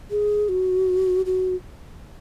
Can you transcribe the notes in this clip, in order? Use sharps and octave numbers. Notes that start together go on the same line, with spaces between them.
G#4
F#4
F#4